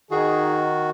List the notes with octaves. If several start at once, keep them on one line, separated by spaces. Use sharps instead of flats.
D#3 D#4 F#4 G#4